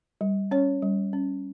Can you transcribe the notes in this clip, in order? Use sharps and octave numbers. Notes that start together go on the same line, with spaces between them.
G3
C#4 C#5
G3
C#4